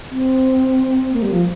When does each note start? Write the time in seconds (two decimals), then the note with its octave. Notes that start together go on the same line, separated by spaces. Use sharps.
0.10 C4
1.13 A#3
1.22 G3
1.31 F3